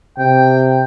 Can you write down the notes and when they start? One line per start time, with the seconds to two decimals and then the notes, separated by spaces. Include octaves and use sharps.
0.18 C3 G5